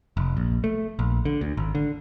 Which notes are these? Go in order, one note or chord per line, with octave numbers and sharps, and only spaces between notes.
F1
A#1
A3
A#1
D3
D2
G#1
D3